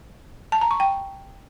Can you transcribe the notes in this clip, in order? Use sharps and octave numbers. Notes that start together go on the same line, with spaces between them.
A5
A#5
C#6
G5